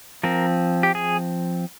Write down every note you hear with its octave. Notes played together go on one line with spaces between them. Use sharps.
F3 C4 A#4
G4
G#4